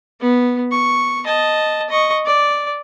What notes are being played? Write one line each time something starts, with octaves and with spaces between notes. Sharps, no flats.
B3
C#6
D#5 A5
D#5 C#6
D5